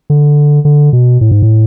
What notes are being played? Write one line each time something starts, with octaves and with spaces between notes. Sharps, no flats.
D3
D3
B2
A2
G#2
A2